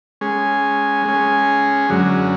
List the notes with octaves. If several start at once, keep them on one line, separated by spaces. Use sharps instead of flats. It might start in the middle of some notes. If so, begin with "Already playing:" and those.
G#3 C#4 G#4
G#3 C#4 G#4
F#2 D3 F#3 C#4